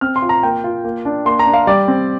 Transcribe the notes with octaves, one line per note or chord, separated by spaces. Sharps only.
C4 F6
C6
F4
A#5
A#3 G5
F4
A#3
D4
A#3 C6
A#5
D4
F5
G3 D5
C4